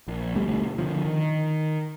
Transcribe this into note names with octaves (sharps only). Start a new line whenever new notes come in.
A#1
D2 B2 G3 A3
D3 D#3 F3
D#3